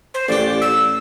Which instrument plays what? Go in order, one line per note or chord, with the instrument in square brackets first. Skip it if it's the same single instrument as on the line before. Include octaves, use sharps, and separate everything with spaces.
[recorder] C5
[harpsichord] A1 G4 [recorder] D5
[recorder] E6